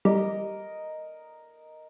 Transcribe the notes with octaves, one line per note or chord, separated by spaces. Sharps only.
G3 A#4 D#5